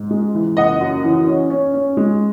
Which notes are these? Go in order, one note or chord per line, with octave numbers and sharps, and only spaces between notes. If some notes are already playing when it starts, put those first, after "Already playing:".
Already playing: G#2
G#3
E3
F#1 D#5 F#5
F#2
E3
C#4
C#4
C#4
G#3